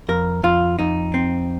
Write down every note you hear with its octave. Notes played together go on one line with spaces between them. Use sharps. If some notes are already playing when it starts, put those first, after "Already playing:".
F2 A#4
F2 F4
F2 D#4
C4